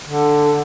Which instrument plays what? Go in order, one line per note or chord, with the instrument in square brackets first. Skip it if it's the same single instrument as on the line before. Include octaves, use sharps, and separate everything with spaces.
[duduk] D3